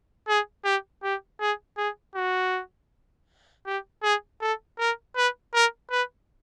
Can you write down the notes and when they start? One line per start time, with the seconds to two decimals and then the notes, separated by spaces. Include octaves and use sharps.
0.28 G#4
0.64 G4
1.03 G4
1.40 G#4
1.77 G#4
2.15 F#4
3.66 G4
4.03 G#4
4.41 A4
4.79 A#4
5.16 B4
5.54 A#4
5.91 B4